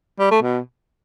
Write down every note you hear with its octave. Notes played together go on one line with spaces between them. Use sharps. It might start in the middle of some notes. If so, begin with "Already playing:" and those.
G3
A3
B2